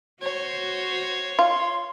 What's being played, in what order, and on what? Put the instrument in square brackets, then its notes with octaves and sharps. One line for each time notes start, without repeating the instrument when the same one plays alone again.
[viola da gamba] F#4 C5 [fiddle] C#5
[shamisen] F4 [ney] C6